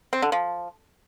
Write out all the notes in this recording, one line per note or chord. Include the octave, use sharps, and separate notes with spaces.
C4
D3
F3